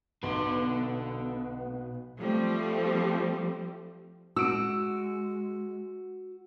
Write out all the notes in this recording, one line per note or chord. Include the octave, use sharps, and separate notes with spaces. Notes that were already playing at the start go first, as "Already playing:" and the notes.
B1 B2 D3 B3 B4 C6
F3 G3 A3 C4
G#3 F#4 E6 D7